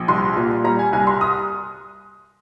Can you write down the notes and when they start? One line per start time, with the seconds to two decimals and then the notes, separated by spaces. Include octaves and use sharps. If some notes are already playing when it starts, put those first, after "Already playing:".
Already playing: A#1
0.08 C2 C6
0.36 A#2
0.64 G3 A#5
0.79 G#5
0.93 C2 G#5
1.07 C6
1.21 D#6